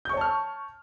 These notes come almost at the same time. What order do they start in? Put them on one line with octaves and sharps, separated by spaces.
G6 C#6 C#5 A5 F6